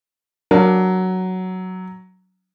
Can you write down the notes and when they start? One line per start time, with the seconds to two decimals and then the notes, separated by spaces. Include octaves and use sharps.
0.51 F#3 D4 A#4